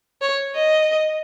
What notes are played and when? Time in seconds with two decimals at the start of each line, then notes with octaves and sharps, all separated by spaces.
0.22 C#5
0.55 D#5